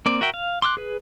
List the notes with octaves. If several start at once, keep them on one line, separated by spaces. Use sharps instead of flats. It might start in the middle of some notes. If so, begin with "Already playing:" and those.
A#3 C4 D5
F#4 A#4 E5 G5
F5
C6 D6 E6 F#6
G#4 B4